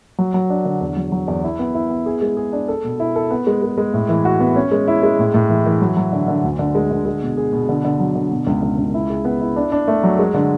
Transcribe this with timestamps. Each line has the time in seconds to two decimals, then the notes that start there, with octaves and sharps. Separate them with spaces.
0.18 F#3
0.34 F#3
0.50 D4
0.65 D3
0.81 E2
0.96 F#3
1.12 F#3
1.28 E2
1.44 E4
1.59 B3
1.75 E4
1.90 B3
2.06 G#4
2.22 G#3
2.37 G#4
2.53 D4
2.68 A4
2.84 B2
3.00 E4
3.16 A4
3.30 B3
3.47 G#3
3.62 G#3
3.78 G#3
3.94 A2
4.09 E3
4.25 F#4
4.40 B3
4.56 C#4
4.72 G#3
4.88 E4
5.03 G#3
5.19 A2
5.34 A2
5.50 E3
5.66 E3
5.81 F#3
5.97 F#3
6.13 D3
6.28 D3
6.44 D2
6.59 D3
6.75 G#3
6.91 D3
7.06 G#3
7.22 B2
7.37 G#4
7.53 B2
7.69 D3
7.85 D3
8.00 F#3
8.15 D3
8.31 B2
8.47 C#2
8.63 C#2
8.78 C#2
8.94 E4
9.10 G#4
9.25 B3
9.40 E4
9.56 D4
9.72 D4
9.88 A3
10.04 F#3
10.19 G#3
10.34 D3